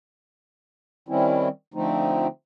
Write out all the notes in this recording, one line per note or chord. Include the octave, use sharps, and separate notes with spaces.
D#3 G3 C4 C#4 E4
D3 F3 A3 C4 D#4